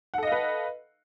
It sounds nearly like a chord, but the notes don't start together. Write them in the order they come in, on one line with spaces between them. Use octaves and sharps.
F#5 A4 D#5 F5 B4